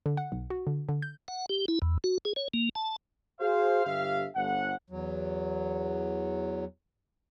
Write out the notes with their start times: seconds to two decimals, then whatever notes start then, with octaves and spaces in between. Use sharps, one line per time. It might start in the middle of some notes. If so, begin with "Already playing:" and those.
0.06 D3
0.17 F#5
0.32 B1
0.50 F#4
0.67 D3
0.89 D3
1.02 G6
1.28 F#5
1.49 G4
1.68 E4
1.82 E2
2.04 F#4
2.25 G#4
2.36 C#5
2.54 A#3
2.75 A5
3.40 F#4 G#4 C5 F5
3.85 G1 G2 D3 G4 E5 F5
4.36 G1 F#5
4.90 E2 F#3